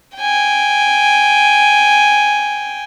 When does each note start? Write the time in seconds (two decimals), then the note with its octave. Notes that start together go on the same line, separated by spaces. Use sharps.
0.16 G5 G#5